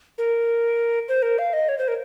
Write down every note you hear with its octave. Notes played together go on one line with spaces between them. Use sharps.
A#4
C5
A#4
F5
D#5
C#5
C5
A#4